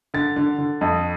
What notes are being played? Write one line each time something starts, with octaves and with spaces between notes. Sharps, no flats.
D3 A6
D3
D3
F2